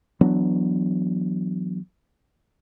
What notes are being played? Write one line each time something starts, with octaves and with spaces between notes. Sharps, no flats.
E3 F#3 B3 D4